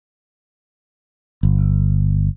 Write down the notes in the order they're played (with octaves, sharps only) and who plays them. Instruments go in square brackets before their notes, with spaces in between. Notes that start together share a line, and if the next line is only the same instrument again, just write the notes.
[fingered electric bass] G1